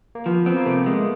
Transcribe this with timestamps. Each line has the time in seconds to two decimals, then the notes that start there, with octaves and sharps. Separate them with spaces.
0.15 A#3
0.26 F3 B3
0.46 B3 C4
0.56 A#3
0.66 C3 A3
0.86 G#3